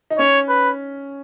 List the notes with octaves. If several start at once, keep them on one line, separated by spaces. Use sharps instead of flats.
D#4
C#4 C#5
B4